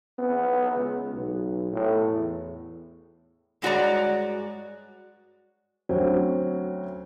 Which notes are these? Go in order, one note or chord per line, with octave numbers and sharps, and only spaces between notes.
B3
C#2
B1
A2
E2
G2 G#3 F#4 C#5 D5 A#5
D2 F#3 C4 C#4